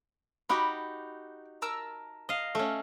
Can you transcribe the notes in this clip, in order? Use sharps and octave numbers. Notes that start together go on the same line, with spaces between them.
D#4 F#4 G4 B5 D6
A#4 A5 E6
D#5 F5
A3 C#4